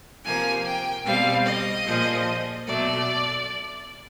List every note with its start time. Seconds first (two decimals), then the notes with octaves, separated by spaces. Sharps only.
0.25 C3 F3 A#3 G#5
0.65 G5
1.05 B2 G3 C4 F5
1.46 D#5
1.86 A#2 F3 G#3
2.67 B2 F#3 A3 D5